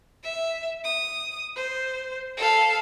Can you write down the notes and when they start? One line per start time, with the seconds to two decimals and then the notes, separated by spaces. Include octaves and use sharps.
0.23 E5
0.84 D#6
1.56 C5
2.37 A4 F5